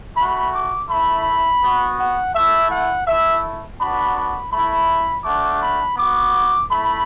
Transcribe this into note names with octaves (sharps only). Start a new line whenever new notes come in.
A3 F#4 B5
D6
A3 E4 B5
B3 F#4
F#5
A3 E4 E5
F#5
A3 E4 E5
B3 D4 F#4 B5
B5
A3 E4 B5
A3 D4 F#4 D6
B5
B3 F#4 D6
A3 E4 B5